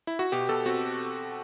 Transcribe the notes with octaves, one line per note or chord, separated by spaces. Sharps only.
E4
F#4
B2 G4
B2 A4
C4 F#4